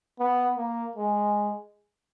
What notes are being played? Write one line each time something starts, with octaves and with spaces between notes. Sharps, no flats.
B3
A#3
G#3